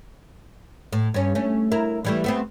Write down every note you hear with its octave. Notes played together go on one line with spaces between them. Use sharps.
A2
G2 C#4
A3 C#4
E4 A#4
E3 G3 A3
A3 B3 C4